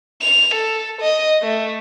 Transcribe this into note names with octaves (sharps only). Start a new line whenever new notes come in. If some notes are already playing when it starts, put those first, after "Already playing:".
F7
A4
D#5
A3